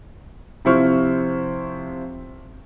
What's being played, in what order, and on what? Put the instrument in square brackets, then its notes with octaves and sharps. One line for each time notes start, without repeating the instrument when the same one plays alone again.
[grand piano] C3 F3 E4 C5 C#6 F6